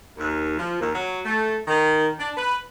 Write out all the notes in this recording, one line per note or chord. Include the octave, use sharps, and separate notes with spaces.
D#2
F3
D#2
F#3
A3
D#3
D4
B4